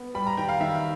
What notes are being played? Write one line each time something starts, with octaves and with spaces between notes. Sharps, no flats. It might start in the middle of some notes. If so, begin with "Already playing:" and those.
Already playing: B3
G3 B5
A#5
D#3 G5
F5
D#3 E5